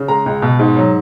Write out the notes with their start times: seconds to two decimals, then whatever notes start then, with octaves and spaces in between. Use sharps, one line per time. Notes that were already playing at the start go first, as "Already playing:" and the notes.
Already playing: C#3
0.08 G#3 A#5
0.26 C#2
0.42 B2
0.59 G#2
0.76 F#3